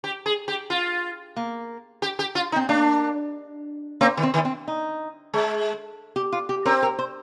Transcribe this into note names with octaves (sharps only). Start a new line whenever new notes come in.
G4
G#4
G4
F4
A#3
G4
G4
F4
D#4
C4
A#3 D4
A#3 C4
D#3
C4
D#3
C4
D#4
G#3
G4
F4
G4
C4 A#4
A#4
C5